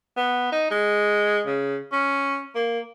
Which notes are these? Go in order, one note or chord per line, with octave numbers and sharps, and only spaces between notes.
B3
D#4
G#3
C#3
C#4
A#3